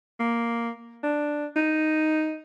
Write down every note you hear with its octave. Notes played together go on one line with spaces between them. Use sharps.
A#3
D4
D#4